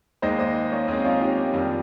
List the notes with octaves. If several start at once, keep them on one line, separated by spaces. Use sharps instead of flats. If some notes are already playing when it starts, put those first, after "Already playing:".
D#2 D#3 G#3 C5 D#5
C5 D#5
A#3 C#4
D#2 D#3 G#3 C4 D#4
C#4 F4
D#4 G4
A#3
F2 D#3 G3